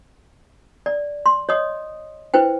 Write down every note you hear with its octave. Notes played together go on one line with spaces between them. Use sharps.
D5
C6
C#5 D#5 D#6
E4 B4 C5 G5